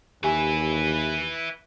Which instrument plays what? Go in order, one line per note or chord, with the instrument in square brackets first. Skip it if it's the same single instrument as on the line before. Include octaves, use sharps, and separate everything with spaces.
[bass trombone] D#2 [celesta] G4 G#5 [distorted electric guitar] B4 E5